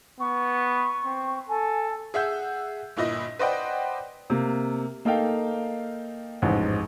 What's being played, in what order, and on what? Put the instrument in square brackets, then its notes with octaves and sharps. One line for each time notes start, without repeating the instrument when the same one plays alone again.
[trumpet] B3 [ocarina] C#6
[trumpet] C4
[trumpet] A4 [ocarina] G#5
[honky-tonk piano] G#4 E5 F#5 E6 G6
G1 A#2 E4 D#5 A#6
B4 C5 D5 D#5 F#5 G5
[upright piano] C3 A#3
A#3 D#4 A4 F5 G5
A1 F2 G#2